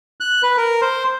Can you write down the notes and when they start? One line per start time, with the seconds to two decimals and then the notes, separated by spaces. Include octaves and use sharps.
0.20 F#6
0.43 B4
0.57 A#4
0.82 C5